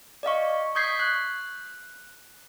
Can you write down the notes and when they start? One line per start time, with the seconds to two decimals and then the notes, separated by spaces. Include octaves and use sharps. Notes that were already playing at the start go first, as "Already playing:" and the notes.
0.23 D5 D#5 F5 C#6
0.75 C#6 D#6 G6 G#6 B6 C7
1.00 F#6